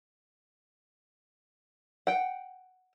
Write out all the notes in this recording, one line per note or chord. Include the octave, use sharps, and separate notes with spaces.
F#5 G5